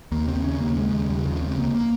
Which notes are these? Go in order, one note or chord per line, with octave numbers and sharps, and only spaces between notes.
D#2 A#3
C#3 C4
D#2 C#4
D#2 A#3
C#3 G#3
D#2
D#2 G3
C#3 F3
C#2 C4
C#2 A#3
A#3